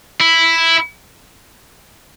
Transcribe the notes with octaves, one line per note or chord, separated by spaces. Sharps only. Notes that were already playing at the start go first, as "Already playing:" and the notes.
E4